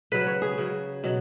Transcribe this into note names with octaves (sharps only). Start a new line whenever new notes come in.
C#3 F#3 B4
C#5
G#4
C#3 F#3
B2 F#3